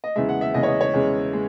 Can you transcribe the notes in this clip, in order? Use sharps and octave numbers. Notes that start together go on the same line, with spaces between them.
D#5
E2 C#3 G#3 E5
F#5
E5
E2 C#3 G#3 D#5
C#5
D#5
C#5
E2 C#3 G#3
G#3